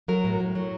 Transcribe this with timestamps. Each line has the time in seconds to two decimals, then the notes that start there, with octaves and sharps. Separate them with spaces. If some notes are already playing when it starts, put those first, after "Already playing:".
0.08 F#3 A#4
0.24 A2
0.40 A2
0.55 F#3